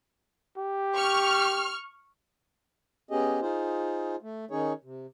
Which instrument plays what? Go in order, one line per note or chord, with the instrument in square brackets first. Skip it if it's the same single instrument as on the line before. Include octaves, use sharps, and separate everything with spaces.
[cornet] G4
[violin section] C#6 F6
[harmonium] B3 C#4 G4 G#4 D#5
D#4 F4 G#4 C5
A3
D#3 C#4 D#4 G#4 C#5
C3